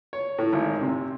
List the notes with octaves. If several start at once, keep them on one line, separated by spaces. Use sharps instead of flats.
C#5
A2
G#1
C3